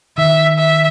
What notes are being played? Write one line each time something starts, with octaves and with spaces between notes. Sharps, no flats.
D#3 E5
E5